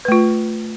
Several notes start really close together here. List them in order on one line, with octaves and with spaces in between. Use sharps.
B4 A3 F4